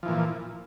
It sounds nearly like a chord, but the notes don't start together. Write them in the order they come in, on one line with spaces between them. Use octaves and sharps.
F3 E3 A#2